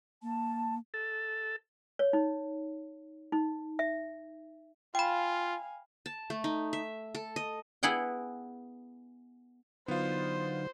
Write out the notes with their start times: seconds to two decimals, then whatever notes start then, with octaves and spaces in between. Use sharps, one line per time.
0.22 A#3 A5
0.94 A4
1.99 C#5
2.13 D#4
3.32 D#4
3.79 E5
4.95 F4 F5 G5 G#5 B5
6.06 A5
6.30 A3
6.44 D#4
6.73 E5
7.15 A4
7.36 D#5
7.83 B3 E4 G#4 F#5 G5
9.88 D3 F#3 B3 D#4 F4 C5